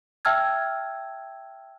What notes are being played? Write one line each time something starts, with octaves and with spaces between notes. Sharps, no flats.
E5 G5 A5 E6 F6 G#6